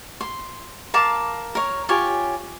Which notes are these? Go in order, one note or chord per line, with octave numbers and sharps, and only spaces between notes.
C6
A#4 F5 A5 D6
A#4 C#5
F4 G4 C#5 G#5